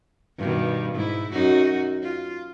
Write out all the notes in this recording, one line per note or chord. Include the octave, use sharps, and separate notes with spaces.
G2 B2 D#3
G#2 E4
F#2 D#4 F#4
F4